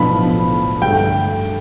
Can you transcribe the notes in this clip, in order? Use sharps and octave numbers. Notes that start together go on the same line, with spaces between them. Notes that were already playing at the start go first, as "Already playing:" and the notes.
Already playing: B1 A2 F3 B3 D4 B5
G2 D3 A3 G5